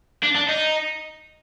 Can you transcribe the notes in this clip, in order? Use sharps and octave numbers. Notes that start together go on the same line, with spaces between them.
D4
D4
D#4